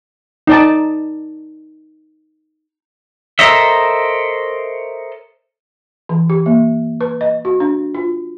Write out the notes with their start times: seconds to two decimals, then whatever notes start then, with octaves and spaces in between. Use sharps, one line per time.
0.47 D#4 D5 A5
3.39 A4 A#4 C5 C#5 D#5 E5
6.09 E3
6.30 G4
6.46 A#3
7.01 B4
7.21 D#5
7.45 F#4
7.60 D4
7.95 F4